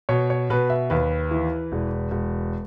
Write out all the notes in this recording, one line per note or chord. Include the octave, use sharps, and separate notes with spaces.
B2 C#5
C#5
B2 B4
E5
D#2 B4
E3
E1
E1